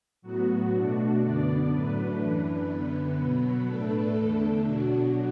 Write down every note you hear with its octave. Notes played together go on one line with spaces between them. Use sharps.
A2 F#3 B3 F#4
B2 A3 D4
F#2 D3 B3 D4 D5
A2 F#3 A3 D4 B4
F#2 E3 D4
F#2 D3 B3
B2 F#3 B3
A2 A3 D4 A4
E2 D3 A3 D4
B2 F#3 D4 F#4